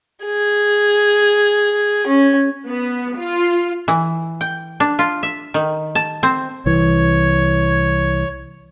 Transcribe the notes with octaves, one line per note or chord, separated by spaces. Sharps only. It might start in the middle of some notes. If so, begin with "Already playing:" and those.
G#4
C#4
B3
F4
E3
G5
D4
F4
E5
D#3
A5
C4
C2 E3 C#5